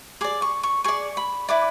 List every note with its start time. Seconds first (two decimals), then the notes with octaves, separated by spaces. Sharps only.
0.21 G#4 D5 D6
0.42 C#6
0.63 C#6
0.84 G#4 D5 C#6
1.17 B5
1.48 E4 B4 D5 D6